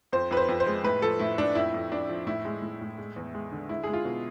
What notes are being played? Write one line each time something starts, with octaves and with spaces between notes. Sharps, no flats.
F2 C5
F2 B4
C5
F2
C5
G#3
A2 B4
F3 A4
A2 E4
A2 D4
F2 E4
F2
F2 D4
F3
A2 E4
G#3
A2
A2
G#3
E2
G#3
D3
G#3 E4
G#3 G#4
F4
B2